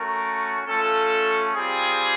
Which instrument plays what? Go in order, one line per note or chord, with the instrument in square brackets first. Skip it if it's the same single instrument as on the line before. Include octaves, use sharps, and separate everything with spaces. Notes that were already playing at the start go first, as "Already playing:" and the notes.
Already playing: [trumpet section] A3 C#4 F#4 A#4
A3 C#4 F4 A4
G3 C4 F4 G#4